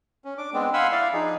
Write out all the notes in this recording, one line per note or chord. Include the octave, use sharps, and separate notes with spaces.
C#4
D4 D6
G#3 B3 C4 D4
F5 F#5 G#5 B5 C6 E6
E4 D5 F5
F3 D4 D#4 G#4